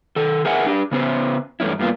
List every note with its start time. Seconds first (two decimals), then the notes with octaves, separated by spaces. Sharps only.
0.16 D#3 A4
0.45 G#4 A#4 E5 F#5 G#5
0.66 D4 G4
0.91 C#3 B3 C#4 C5
1.60 E2 G2 A3 C#4 E4
1.79 G2 A#3 B3 F4